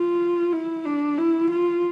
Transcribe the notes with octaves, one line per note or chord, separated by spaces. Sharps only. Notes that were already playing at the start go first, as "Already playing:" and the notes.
Already playing: F4
E4
D4
E4
F4